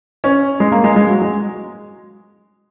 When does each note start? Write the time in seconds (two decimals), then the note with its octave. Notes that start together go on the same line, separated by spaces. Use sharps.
0.24 C#4
0.60 G#3
0.72 A#3
0.84 G#3
0.96 G#3
1.09 F#3
1.21 G#3